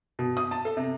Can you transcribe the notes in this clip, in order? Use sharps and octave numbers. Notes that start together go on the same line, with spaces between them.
B2
D#6
A5
A4
C3